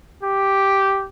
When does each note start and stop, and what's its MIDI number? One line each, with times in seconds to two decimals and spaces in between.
0.23 1.06 67